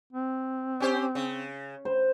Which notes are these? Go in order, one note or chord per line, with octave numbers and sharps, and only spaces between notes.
C4
C#4 G4 C5
C#3
C5